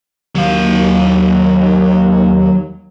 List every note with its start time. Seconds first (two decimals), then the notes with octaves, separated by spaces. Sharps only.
0.35 D#2 F#3 F5